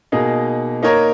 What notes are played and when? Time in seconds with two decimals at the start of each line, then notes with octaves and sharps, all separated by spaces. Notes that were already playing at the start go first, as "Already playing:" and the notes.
0.12 B2 A#3 D#4 G#4
0.82 A#3 D#4 A#4 C#5